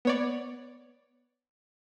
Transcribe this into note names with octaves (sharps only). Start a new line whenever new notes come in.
B3 C#5 D5